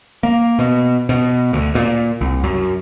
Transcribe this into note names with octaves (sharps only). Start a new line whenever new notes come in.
A#3
B2
B2
D2
A#2
C2
F#2